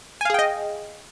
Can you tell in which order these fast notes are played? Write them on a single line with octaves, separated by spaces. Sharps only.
G#5 F5 G#4 G5 D#5